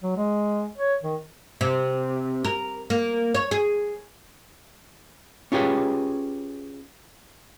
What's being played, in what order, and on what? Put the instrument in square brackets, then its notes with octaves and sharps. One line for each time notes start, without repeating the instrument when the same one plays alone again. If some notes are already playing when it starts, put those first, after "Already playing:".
[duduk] F#3
G#3
C#5
D#3
[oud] C3
A#4
A#3
C#5
G#4
[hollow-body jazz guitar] C#4 F4 G4 G#4 B4